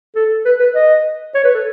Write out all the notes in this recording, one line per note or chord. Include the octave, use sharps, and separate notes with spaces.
A4
B4
B4
D#5
C#5
B4
A4